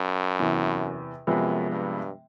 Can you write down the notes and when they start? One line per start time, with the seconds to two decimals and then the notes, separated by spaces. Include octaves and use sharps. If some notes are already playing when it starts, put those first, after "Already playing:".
Already playing: F#2
0.39 E2 C3 E3
1.27 F#2 C3 F3 G#3 B3
1.71 G2